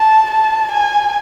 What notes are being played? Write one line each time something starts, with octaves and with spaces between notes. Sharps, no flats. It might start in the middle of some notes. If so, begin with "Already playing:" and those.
Already playing: A5
A5
G#5